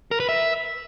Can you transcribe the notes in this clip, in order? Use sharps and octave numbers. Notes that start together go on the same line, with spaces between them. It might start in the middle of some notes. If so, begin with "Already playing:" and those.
A#4
B4
E5